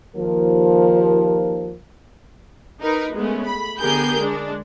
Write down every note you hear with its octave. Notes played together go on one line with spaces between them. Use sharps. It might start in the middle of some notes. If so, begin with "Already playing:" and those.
D#2 F3 A#4
D#4 A#4 B4
G#3 A3 B3 C#4
B5
D3 B3 G4 G#4 A#4 G6
G#3 D4